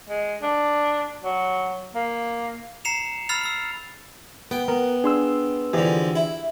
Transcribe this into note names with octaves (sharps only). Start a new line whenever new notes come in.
G#3
D4
F#3
A#3
A#5 C7 C#7 E7 F7
B5 E6 F6 A6 C7 F7
E6 C7 F7
B3 G5
B3 A#4
D4 G#4 C6 E6
F2 D3 E3 G4 G#4
E4